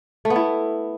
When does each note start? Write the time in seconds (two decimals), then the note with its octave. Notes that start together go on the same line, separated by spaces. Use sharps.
0.25 A3
0.30 B3
0.36 E4